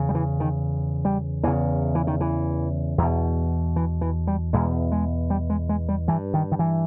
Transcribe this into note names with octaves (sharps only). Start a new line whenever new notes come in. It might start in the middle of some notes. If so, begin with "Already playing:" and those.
Already playing: E2 C#3
G3
E3
D#3
G3
E2 C#3 E3
E3
D#3
E3
E2 B2
E3
E3
G3
E2 B2 G#3
G#3
G3
G#3
G#3
G3
G2 E3
D#3
D#3
E3